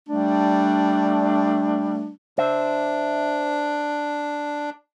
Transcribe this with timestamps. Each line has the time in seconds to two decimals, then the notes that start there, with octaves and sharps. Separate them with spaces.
0.09 G3 A3 D4
2.38 D4 C5 E5